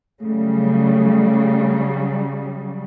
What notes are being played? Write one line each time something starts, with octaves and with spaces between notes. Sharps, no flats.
C#3 F#3 G3 A3